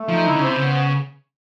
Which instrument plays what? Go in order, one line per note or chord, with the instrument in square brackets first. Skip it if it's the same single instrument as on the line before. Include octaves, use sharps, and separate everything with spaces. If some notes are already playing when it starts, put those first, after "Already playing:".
Already playing: [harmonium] A3
[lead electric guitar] F3 [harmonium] D#4
[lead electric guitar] D3 [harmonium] E4
[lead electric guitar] C#3
[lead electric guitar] C3 [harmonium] C5
[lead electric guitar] C#3
[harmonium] B3